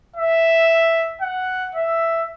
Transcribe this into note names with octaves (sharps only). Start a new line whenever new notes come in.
E5
F#5
E5